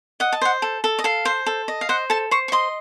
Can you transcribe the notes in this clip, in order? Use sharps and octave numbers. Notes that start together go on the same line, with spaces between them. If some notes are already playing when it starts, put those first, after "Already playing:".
D#5 F#5
A5
C5 F#5
A4
A4
D#5
A4 F5
C5
A4
D#5
F5
C5 F#5
A4 A5
C5 C#6
C#6
D#5 C6